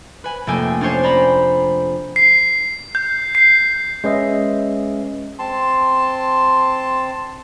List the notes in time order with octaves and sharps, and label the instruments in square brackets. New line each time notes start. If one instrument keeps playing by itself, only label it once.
[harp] B4 G#5
F1 A3 A#3 A4 G5 G#5
C#4 D4 C5 C#5 G#5
C5 D5 A#5 B5
[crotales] C7
G6
C7
[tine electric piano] G#3 C#4 B4 D#5 E5
[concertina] C4 A5 C6